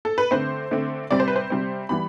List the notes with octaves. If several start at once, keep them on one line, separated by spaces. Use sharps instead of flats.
A4
B4
D3 A3 C4 C5
D3 A3 C4
C3 G3 C4 D5
C5
B4
C5
C3 G3 C4
E3 G3 B3 B5